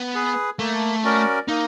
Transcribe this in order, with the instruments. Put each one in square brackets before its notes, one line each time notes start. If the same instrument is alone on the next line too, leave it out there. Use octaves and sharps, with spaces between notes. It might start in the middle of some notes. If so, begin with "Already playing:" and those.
Already playing: [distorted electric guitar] B3
[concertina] G#4 B4
[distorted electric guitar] A3 [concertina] A#3
[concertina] C#4 F#4 A#4 D5
[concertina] A#3 [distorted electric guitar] D#4